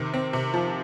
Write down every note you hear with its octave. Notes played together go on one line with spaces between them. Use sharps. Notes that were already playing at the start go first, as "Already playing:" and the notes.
Already playing: C3 D#3
C4
C3
F3